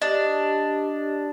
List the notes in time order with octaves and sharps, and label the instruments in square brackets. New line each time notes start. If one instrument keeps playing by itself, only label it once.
[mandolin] D4 [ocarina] G4 [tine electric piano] D#5